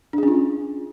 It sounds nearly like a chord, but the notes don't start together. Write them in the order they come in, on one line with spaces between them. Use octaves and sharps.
D4 G#4 C#4 F4